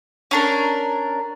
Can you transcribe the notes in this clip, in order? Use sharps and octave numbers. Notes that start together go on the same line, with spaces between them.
C#4 D4 A#4